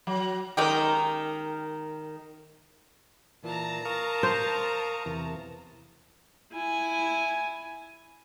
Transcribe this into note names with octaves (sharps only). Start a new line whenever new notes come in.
F#3
D#3 G#3 C#4 G4 A#4 D#5
A#2 E3 A5 A#5
A#4 F5 C#6 D#6
C5
E2 C3 E3
E4 G#5